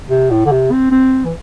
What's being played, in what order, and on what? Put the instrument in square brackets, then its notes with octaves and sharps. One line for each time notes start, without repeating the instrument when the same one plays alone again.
[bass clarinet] C3
A2
D3
C3
C4
C4
E3